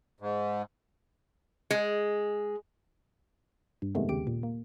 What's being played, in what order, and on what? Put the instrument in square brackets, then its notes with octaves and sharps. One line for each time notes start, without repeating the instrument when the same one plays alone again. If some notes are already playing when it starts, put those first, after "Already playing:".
[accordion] G#2
[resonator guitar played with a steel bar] G#3
[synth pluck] G2
F2 C3 D#3 G#3 A3 B3
D#2 C#3 G4 D7
A#2
A#3